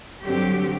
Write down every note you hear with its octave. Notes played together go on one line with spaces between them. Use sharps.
G2 D3 F#3 C4 G4